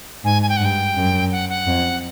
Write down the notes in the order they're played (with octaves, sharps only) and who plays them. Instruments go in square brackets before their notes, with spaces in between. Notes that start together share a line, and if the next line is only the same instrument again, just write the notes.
[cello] G#2 [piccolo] G#5
[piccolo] G#5
G5
F#5
[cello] G2 [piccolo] G5
[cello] F#2
[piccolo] F#5
F#5
[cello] F2